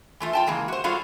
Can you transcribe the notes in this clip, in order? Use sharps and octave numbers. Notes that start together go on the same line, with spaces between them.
E3 A3 F4
F4 G5 A5
C#3 E3 G#3 A#3
F#4 C5
G3 F4 F#4 G#4 A4 F5